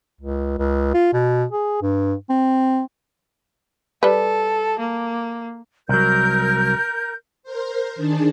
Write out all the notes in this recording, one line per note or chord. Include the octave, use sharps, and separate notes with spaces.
C#2
C#2
F4
B2
G#4
G2
C4
G3 A4 B4
A#3
C2 F#3 A#4 G6
A#4 C5
D#3 D4 G#4 A5